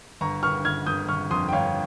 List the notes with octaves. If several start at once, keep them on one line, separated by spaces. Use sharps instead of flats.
G1 A#5 C#6
G1 C#6 F6
G1 F6 G#6
G1 D#6 G6
G1 C#6 F6
F2 C6 D#6
G5
G1 C#5 F5